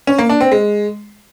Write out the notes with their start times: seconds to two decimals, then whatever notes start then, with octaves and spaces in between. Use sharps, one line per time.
0.07 C#4
0.18 A#3
0.29 D4
0.41 C4
0.52 G#3